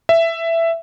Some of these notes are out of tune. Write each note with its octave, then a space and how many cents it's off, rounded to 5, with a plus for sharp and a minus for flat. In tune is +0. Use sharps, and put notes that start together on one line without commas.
E5 +10